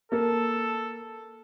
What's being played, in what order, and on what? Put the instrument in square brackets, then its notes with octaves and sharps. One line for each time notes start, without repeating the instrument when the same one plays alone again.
[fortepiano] A#3 [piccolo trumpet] A4